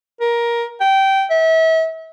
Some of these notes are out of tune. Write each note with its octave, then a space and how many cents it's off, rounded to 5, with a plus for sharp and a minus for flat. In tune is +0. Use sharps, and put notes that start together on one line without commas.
A#4 +15
G5 -15
E5 -35